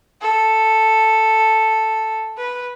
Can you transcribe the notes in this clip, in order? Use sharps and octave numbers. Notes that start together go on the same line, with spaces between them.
A4
B4